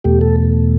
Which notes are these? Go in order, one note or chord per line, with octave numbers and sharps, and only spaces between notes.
E2 B2 A3 G4
A4